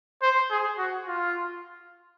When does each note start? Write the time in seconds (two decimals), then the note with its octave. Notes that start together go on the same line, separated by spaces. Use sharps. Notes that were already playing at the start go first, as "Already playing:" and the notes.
0.22 C5
0.50 G#4
0.78 F#4
1.08 F4